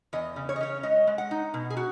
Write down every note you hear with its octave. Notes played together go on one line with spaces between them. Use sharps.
E2 D#5
C#3
C#5
D#5
C#4 C#5
G#3 D#5
G#3
F#5
D#4
B2
G#4
F#4